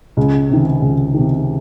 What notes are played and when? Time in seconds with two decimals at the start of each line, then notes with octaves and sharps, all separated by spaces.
0.17 C#2
0.50 C3 D#3
0.82 C#2
1.14 C3 D#3